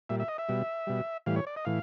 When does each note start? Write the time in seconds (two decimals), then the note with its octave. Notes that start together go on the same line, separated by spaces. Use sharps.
0.09 A#2 G3 E5
0.20 E5
0.28 D#5
0.38 E5
0.49 B2 G3
0.87 B2 G3
1.26 A2 E3 G3 F5
1.36 C#5
1.47 D5
1.56 D#5
1.65 A2 E3 F5